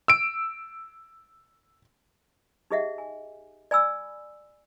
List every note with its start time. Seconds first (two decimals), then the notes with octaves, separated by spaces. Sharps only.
0.08 E6 D7
2.70 D#4 G4 G#4 D#5 E5 F#5
2.98 G#5
3.71 D5 G#5 B5 E6